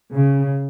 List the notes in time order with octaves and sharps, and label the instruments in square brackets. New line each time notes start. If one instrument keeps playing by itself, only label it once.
[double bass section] C#3